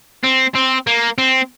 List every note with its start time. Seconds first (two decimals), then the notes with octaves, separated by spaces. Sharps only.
0.24 C4
0.55 C4
0.87 A#3
1.18 C4